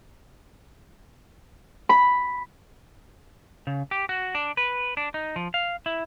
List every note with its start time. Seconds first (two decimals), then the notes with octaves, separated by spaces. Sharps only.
1.89 B5
3.67 C#3
3.91 G4
4.09 F#4
4.35 D4
4.57 B4
4.97 D4
5.14 D#4
5.36 F3
5.54 F5
5.86 E4